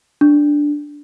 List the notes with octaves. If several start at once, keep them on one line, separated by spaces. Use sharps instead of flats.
D4